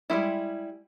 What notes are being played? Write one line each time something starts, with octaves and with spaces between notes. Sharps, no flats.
G3 G#3 A#3 E4